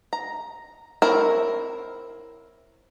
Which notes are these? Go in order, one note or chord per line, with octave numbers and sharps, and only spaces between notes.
A#5
C4 E4 A#4 C#5